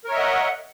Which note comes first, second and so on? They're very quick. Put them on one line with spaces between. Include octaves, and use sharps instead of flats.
A#4 C#5 E5 D#5 F#5